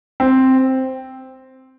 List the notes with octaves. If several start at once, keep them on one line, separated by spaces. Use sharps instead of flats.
C4